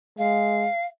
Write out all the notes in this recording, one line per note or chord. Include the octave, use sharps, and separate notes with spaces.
G#3 F5